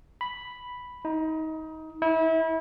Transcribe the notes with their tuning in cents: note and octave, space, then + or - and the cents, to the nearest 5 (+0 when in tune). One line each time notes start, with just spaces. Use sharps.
B5 +0
D#4 +25
E4 -30